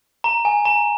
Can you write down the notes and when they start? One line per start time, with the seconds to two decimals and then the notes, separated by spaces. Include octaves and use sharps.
0.24 A#5
0.45 G#5
0.65 A#5